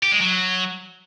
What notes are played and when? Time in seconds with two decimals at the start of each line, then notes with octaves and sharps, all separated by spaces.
0.03 G4
0.12 G#3
0.20 F#3